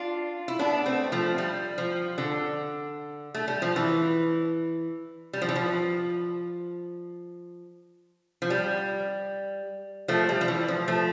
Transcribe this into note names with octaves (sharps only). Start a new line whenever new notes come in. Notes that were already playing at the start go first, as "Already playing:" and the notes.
Already playing: D4 F4
E4
B3 D4
A3 C4
F3 A3
G3
F3
D3
A3
G3
F3
E3
G3
F3
E3
F3
F3
G3
F3 A3
G3
F3
E3
F3
F3 A3